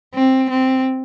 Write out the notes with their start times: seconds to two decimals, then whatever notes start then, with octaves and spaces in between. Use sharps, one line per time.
0.15 C4
0.50 C4